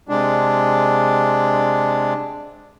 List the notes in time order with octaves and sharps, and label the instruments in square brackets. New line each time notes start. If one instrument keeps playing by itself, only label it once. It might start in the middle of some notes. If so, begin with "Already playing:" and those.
[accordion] C3 G#3 D4